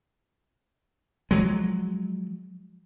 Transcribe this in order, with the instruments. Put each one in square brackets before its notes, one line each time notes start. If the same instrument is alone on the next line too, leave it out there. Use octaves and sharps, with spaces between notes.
[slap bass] F3 F#3 G#3